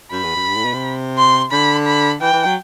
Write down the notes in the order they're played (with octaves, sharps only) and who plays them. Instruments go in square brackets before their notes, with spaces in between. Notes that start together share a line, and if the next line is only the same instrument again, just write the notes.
[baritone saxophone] F#2 [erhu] B5
[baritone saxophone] E2
F#2
G2
A2
B2
C3
[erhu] C6
[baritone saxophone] D3 [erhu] B5
[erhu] B5
[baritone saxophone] E3 [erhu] G5
[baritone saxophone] E3
F#3